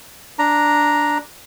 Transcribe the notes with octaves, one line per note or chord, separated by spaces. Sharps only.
D4 A#5